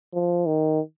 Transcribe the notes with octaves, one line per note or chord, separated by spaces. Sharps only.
F3
D#3